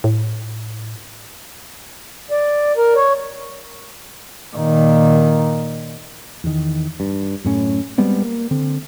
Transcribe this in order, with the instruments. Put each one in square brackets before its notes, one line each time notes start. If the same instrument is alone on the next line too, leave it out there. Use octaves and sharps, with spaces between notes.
[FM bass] A2
[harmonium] D5
A#4
C#5
[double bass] A#2 D#3
[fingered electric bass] E2 D#3
G2
F#2 A2 C#4
G3 G#3 B3 C4
A#3
D3 C4